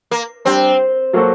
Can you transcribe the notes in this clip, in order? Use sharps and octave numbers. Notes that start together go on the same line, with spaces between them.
A#3
G3 C4 D4 G4
F#3 A#3 F#4 A4 C5